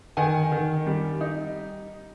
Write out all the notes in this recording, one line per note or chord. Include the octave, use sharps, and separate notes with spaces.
D#3 F#5 G#5
D#3
G3
D#4